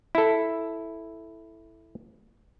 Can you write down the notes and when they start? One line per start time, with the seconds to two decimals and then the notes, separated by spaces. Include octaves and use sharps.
0.15 E4 A4